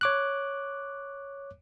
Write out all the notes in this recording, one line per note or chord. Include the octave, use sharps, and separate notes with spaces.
C#5 D6 F#6